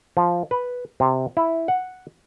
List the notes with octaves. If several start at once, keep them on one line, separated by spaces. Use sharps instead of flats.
F3
B4
C3
E4
F#5